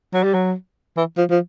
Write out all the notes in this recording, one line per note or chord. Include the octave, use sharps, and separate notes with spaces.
F#3
G3
F#3
E3
F3
F3